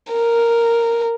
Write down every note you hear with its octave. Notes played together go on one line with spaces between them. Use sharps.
A#4